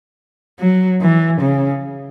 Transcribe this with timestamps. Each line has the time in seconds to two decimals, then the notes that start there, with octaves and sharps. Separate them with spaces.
0.60 F#3
1.01 E3
1.41 C#3